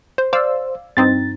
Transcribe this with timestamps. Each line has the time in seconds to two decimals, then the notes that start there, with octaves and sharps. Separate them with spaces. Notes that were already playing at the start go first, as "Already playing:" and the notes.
0.18 C5
0.33 C5 D5 F5 E6
0.97 G2 C4 D#4 A6